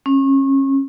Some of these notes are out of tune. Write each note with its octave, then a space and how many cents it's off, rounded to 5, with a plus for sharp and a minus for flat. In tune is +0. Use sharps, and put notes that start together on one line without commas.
C#4 -30